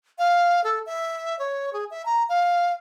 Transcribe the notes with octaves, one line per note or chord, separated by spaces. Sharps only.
F5
A4
E5
C#5
G#4
E5
A#5
F5